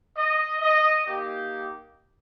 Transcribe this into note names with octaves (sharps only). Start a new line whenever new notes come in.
D#5
D#5
A#3 D#4 G4